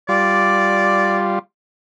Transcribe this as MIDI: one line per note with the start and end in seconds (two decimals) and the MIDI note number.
0.09 1.39 55
0.09 1.39 65
0.09 1.26 74